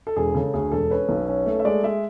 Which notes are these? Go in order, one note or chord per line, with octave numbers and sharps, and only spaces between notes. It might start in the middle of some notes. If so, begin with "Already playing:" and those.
A4
E1 G#4
C#3 A4
D2 G#4
E1 A4
C#4 B4
B1
C#4
A3
E5
G#3 D5
G#3 E5